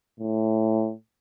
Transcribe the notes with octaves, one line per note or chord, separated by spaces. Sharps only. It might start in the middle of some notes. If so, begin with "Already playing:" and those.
A2